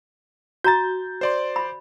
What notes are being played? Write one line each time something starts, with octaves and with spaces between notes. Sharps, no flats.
F#4 A#5 G6 A6
C5 D5 C6
B5